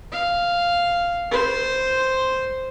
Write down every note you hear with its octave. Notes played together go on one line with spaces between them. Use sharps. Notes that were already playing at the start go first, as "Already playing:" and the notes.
F5
C5